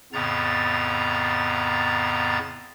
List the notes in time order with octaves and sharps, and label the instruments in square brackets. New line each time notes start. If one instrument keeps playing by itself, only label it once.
[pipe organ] F2 A2 C#3 B3 A#5 A6